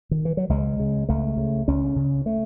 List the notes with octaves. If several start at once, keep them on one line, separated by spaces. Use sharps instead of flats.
D#3
E3
F#3
C#2 G#3
C#3
C#2 A3
C#3
C#2 C#4
C#3
A3